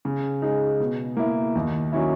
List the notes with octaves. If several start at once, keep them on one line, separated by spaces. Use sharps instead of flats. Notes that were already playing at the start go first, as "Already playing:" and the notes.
C#3
G#3 D#4
B2
A#3 E4
D#2
D#3 F#3 C#4 E4